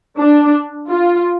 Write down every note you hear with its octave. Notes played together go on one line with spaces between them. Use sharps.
D4
F4